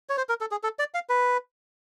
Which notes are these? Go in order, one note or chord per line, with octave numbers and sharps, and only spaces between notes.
C#5
C5
A#4
A4
G#4
A4
D5
F5
B4